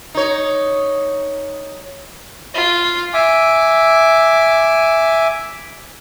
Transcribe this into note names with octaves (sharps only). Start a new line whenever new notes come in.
D#4 C#5
F4
E5 G#5 D6